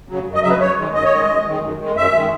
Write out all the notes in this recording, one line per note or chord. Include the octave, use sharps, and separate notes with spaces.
C#3 F#3
F#2
D#5
C#3 F#3 E5
B4
F#2 C#5
D#3 G#3
F#2 D#5
C#5
D#3 G#3 D#5
F#2
D#3 G#3
F#2
D#3 G#3
F#2 E5
D#3 G#3